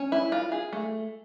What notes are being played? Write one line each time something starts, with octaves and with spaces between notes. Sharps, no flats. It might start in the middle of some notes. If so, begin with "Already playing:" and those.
Already playing: C#4
E4
F4
G#4
A3